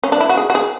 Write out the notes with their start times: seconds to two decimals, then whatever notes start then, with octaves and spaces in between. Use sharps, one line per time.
0.04 C#4
0.12 D4
0.21 E4
0.29 F#4
0.37 G#4
0.50 F#4
0.55 G#4